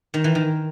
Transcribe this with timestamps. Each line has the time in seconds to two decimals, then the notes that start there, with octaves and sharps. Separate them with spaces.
0.14 D#3
0.24 E3
0.35 D#3